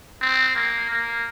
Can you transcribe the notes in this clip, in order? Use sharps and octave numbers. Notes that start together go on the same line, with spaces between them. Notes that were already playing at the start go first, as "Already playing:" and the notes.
C4
A#3
A#3